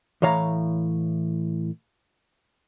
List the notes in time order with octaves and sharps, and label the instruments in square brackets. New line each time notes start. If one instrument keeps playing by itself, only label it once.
[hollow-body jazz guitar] A2 E3 C#5 F5 A#5